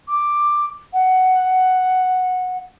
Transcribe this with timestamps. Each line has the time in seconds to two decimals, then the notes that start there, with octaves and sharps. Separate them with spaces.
0.08 D6
0.93 F#5